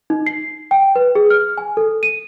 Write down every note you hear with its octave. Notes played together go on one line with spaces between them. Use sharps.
D#4
C7
G5
B4
G#4
F6
G#5
A4
D#7